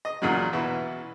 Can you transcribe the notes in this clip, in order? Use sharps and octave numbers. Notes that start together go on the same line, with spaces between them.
D#5
E2 A#2 C#3 F#3
B2 E3 E5